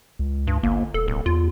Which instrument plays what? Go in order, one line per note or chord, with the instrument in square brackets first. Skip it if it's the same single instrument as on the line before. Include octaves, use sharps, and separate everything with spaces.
[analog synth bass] C#2
[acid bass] G2
[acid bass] G1 [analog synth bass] A#3
[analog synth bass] E1 [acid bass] A4
[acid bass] D1
[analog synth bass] E2 [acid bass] F4